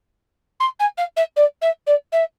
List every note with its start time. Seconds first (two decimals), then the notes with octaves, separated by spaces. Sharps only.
0.60 C6
0.79 G#5
0.98 F5
1.16 E5
1.36 D5
1.62 E5
1.87 D5
2.12 E5